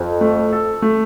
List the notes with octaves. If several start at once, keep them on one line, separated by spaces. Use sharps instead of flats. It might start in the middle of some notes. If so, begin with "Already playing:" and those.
Already playing: F2
A3
A4
A3